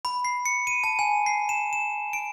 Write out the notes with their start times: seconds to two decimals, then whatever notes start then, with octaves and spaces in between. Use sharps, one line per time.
0.05 B5
0.25 C7
0.46 C#7
0.67 D#7
0.84 A5
0.99 G#5
1.26 C7
1.49 E7
1.73 E7
2.13 D7